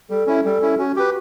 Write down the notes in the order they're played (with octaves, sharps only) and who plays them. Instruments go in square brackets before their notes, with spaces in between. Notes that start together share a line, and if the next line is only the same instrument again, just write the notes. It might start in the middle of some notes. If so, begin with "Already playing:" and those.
[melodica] G3 [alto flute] A4
[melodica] C#4 E4
[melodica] G3 [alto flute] A4
[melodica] C#4 E4
[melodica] C#4 [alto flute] F#4
[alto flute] F#4 [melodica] G4 B4